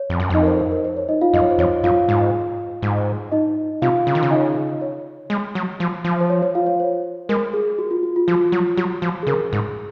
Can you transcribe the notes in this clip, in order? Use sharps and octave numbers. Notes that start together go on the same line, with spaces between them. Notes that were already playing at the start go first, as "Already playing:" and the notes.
Already playing: C#5
F2
F#2
F2 D#4 D#5
A#4
C5
C5
A#4
C5
C#5
D#4 D#5
F4 F5
F#2 D#5
C#5
C5
F2 C#5
F#2 F4 F5
G#2
G#2
D#4 D#5
C3 F4 F5
C#3
D#3
C#3
D#4 D#5
C#5
G#3
F#3
F3
F3
C5
C#5
C#5
F4 F5
C#5
C5
G#3 A#4
G#4
F#4
F4
F#4
F4
F3 F4
F#3
F#3 F#4
F3
G#4
C#3 A#4
G#2